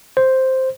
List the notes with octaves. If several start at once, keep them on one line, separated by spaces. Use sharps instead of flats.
C5